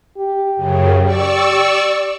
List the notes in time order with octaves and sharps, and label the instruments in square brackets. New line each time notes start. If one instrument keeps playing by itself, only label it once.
[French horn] G4
[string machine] F#2 C#3
D5 C#6 E6